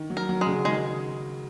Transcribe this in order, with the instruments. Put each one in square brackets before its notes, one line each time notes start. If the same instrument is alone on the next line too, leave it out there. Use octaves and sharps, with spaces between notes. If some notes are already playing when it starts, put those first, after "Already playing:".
Already playing: [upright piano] D#3
F#3
[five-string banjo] A#4
[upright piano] F#3
[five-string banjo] G#3
[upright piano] C#3
[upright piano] D#3 [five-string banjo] G#3